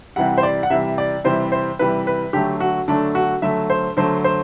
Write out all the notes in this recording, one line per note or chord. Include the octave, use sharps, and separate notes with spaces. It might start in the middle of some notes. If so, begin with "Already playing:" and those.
C3 E3 G3 F#5
C5
D5
F#5
C3 E3 G3 E5
D5
C3 E3 G3 C5
C5
C3 E3 G3 B4
B4
D3 F#3 A3 G4
F#4
D3 F#3 A3 D4
F#4
D3 F#3 A3 E5
C5
D3 F#3 A3 C5
C5